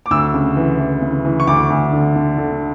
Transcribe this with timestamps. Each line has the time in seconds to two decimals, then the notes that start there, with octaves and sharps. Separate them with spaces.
0.06 D6
0.11 D2 E6
0.34 C#3
0.56 E3
0.79 E3
1.02 C#3
1.25 E3
1.40 C#6
1.47 D2 D6
1.70 D2
1.93 D3
2.16 D3
2.38 D3